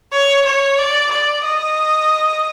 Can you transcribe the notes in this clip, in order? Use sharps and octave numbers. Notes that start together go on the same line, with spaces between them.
C#5
C#5
D5
D5
D#5